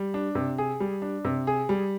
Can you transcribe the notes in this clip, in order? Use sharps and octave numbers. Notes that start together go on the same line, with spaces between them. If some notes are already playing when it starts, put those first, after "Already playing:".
Already playing: G3
D4
C3
G#4
G3
D4
C3
G#4
G3